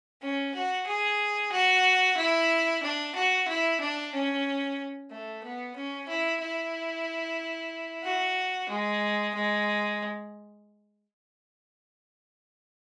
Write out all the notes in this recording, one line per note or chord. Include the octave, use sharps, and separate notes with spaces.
C#4
F#4
G#4
F#4
E4
D4
F#4
E4
D4
C#4
A3
B3
C#4
E4
E4
F#4
G#3
G#3